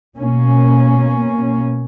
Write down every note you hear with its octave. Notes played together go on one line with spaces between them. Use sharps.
B2 A#3 C#4